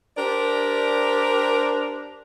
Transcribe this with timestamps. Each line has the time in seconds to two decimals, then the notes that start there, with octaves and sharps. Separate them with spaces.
0.17 D4 G4 A#4 C5 D5